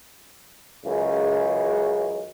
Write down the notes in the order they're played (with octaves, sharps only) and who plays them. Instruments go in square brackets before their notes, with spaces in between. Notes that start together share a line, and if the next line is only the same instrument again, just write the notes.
[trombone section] C#2 F#2 C#3 E3 G#3